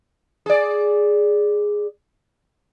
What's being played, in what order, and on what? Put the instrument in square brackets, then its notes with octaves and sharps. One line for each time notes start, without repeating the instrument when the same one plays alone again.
[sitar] G#4 D5